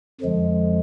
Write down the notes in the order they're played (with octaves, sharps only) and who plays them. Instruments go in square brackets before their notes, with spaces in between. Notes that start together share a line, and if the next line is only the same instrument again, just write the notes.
[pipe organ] F2 D3 F3 G#3